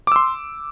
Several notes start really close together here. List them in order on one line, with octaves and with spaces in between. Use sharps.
D6 E6 C6